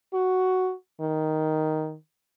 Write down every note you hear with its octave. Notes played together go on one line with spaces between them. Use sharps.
F#4
D#3